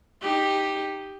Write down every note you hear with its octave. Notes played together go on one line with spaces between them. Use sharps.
D#4 G4